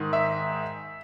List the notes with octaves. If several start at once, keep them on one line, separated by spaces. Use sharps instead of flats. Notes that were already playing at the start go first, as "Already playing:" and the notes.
Already playing: G#2 D#3
E5